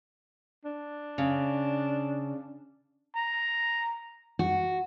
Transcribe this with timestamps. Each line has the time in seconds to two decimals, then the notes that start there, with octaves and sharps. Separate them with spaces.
0.65 D4
1.18 C#3
3.16 A#5
4.39 F#4